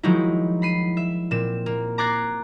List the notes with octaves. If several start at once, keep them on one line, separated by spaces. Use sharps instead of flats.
D#3 F3 F#3 G#3 D#4 E4
B5 C7 D#7
E5
A#2 C4 E7
A#3
A#5 D6 F#6 G#6 A6 C7